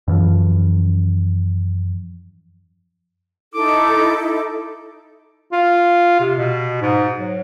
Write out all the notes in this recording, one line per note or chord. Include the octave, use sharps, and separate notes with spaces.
F#2 E3 F3
D#4 E4 A4 D6
F4
C3
B2
G#2
F#3